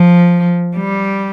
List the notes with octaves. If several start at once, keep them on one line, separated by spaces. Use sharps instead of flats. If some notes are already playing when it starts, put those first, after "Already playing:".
Already playing: F3
G3